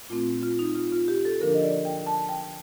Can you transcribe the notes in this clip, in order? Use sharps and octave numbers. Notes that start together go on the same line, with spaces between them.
A#2 A3 C4 F4
F4
D#4
F4
F4
G4
A4
D3 F3 A#3 D4 A#4
D#5
D5
G5
A5
G5